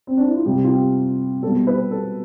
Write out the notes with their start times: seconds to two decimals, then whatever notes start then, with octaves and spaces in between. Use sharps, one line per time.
0.07 C4
0.17 D4
0.26 E4
0.36 F4
0.46 C3 G3 G4
0.64 F4
0.70 G4
1.43 B2 G3 A4
1.67 B4
1.91 A4